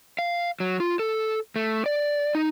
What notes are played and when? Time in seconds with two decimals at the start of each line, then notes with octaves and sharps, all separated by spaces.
0.19 F5
0.60 F#3
0.80 F4
0.99 A4
1.56 A3
1.86 D5
2.35 D#4